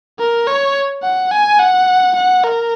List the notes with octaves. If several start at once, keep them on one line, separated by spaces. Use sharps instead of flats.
A#4
C#5
F#5
G#5
F#5
F#5
A#4